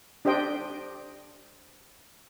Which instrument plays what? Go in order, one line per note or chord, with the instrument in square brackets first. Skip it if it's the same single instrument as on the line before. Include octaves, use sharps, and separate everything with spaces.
[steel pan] D4 G4 C5 D#5 G5